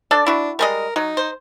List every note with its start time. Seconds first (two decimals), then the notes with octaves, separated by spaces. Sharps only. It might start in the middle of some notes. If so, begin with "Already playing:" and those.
0.11 D4 A4 D5
0.26 D4 E4 F#4
0.59 G3 G#3 A#4 D#5
0.96 F#3 D#4
1.17 C5